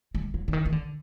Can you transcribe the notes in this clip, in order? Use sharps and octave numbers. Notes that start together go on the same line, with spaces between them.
G#3
F#3
D3
D#3
D#3
D3